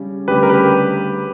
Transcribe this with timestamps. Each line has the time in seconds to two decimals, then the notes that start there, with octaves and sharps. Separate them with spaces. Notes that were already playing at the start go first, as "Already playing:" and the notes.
Already playing: C#3 G3 C#4
0.28 D2 C#3 G3 G4 B4
0.43 A#4
0.50 G4 B4